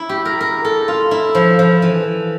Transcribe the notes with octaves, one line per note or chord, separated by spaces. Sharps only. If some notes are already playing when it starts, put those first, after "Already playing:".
Already playing: E4
G4
A#4
A#4
A4
F4
E4
F3
F3
E3